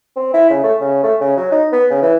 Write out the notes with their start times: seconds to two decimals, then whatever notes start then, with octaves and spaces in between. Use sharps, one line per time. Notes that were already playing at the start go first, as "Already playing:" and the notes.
0.16 C4
0.34 E4
0.50 C#3
0.64 A3
0.81 C#3
1.03 A3
1.20 C#3
1.37 F#3
1.52 D#4
1.72 B3
1.90 C#3
2.02 E3